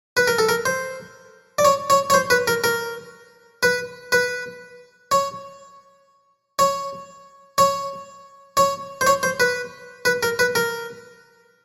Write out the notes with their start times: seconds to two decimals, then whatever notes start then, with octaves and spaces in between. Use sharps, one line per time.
0.17 B4
0.28 A#4
0.39 A4
0.49 A#4
0.66 C5
1.58 D5
1.65 C#5
1.90 C#5
2.10 C#5
2.14 C5
2.30 B4
2.48 A#4
2.64 A#4
3.63 B4
4.12 B4
5.12 C#5
6.59 C#5
7.58 C#5
8.57 C#5
9.01 C5
9.07 C#5
9.23 C5
9.40 B4
10.05 B4
10.23 A#4
10.39 B4
10.55 A#4